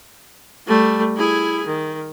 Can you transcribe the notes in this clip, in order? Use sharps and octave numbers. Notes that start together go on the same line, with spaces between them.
G3 A3
E4 G#4
D#3